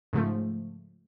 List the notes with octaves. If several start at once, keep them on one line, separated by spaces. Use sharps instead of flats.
G#2 C#3 F3 A3